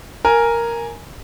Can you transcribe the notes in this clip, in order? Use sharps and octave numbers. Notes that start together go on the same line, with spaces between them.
A#4 G#5